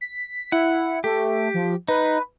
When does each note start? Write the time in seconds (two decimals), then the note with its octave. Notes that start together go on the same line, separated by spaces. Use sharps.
0.01 B6
0.52 E4 F#5
1.04 A3 G4
1.54 F3
1.88 D#4 B4